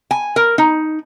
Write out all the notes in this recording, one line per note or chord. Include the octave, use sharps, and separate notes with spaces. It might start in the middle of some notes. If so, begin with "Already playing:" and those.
G#5
A#4
D#4